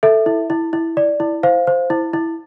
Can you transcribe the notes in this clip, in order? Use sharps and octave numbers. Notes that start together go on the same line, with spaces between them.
A4 E5
E4
E4
E4
D5
E4
C5 F5
C5
E4
E4